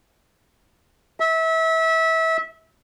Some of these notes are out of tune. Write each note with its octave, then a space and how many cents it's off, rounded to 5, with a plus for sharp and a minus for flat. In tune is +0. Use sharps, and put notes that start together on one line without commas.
E5 -25